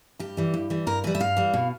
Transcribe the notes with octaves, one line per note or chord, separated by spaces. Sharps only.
G2 G4
E3 G3
G2
E3 G3
G2 A#4
E3 G3 B4
E5
G2 F5
E3 G3
B2